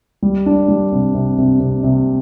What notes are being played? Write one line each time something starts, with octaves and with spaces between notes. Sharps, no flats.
G3
D4
G3
C3
C3
C3
C3
C3